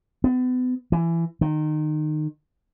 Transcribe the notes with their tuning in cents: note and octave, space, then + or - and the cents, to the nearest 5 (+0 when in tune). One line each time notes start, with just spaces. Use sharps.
B3 +35
E3 +20
D#3 -25